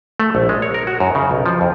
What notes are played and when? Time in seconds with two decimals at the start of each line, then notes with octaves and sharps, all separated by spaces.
0.20 A3
0.35 A#1
0.49 G#3
0.62 C#5
0.74 A#4
0.87 F#4
1.00 F#2
1.15 C#3
1.31 B1
1.46 F3
1.61 F2